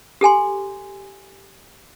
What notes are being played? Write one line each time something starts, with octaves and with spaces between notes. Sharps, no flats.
G4 A4 G#5 C6